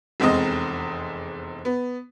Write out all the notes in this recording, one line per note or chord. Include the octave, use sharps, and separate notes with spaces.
F1 E2 G#3 C4 D#5
B3